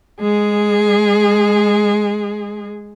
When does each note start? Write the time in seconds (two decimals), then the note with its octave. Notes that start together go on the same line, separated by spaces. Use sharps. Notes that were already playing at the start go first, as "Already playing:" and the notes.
0.19 G#3 G#4